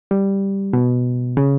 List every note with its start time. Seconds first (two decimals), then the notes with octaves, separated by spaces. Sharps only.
0.11 G3
0.73 B2
1.37 C#3